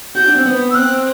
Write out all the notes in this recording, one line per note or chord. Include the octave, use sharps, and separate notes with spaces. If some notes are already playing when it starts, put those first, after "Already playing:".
F#4 G6
D4
C4
B3
E6
C4 F#6